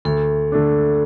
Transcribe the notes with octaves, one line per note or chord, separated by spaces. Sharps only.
D2 A4
D3 A3 D4